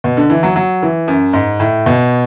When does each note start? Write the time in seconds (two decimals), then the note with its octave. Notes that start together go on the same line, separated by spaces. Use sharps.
0.04 B2
0.17 D3
0.30 E3
0.43 F#3
0.56 F#3
0.82 E3
1.08 F#2
1.33 G#2
1.60 A2
1.86 B2